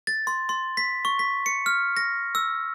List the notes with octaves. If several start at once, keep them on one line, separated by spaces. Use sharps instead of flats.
A6
C6
C6
B6
C#6
B6
C#7
F6
A#6
E6